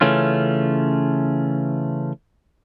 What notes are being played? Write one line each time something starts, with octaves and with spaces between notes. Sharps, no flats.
C#3 E3 A3 C#4 F4